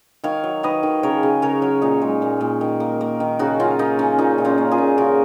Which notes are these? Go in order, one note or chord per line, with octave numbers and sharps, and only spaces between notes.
D#3 C#5 F5
F#3
D#3 B4 D#5
D#3
C#3 A#4 C#5
C#3
C#3 A#4 C#5
F#3
A#2 D#4
G#3
A#2
A#2
D#3
A#3
A#3
D#3
C#3 D#4 F#4
F#3 C#4 F4
A#3 D#4
C#3 C#4
A#2 D#4
A#2
C#4 F4
A#3
F4 G#4
A#2
C#3 F#4 A#4